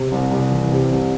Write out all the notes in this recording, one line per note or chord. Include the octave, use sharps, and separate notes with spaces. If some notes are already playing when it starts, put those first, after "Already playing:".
Already playing: C3
C2
C2
E3
C3
C2